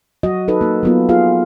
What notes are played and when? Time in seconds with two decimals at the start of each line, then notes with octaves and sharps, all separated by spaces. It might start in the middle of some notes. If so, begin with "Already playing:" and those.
0.23 F#3 F#4 D#5
0.48 D#4 A4 B4
0.61 A#3 D#4
0.83 F#3 B3 F4
1.09 F4 G#4 F5